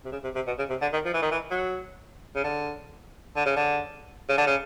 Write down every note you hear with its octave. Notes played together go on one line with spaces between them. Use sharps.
C3
C#3
C3
C3
B2
C#3
C3
D3
D#3
F3
E3
D#3
E3
F#3
C#3
D3
D3
C#3
D3
C#3
D3
C#3